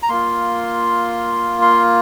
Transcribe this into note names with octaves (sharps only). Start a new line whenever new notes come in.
A#5
A#3 F4 C6
C6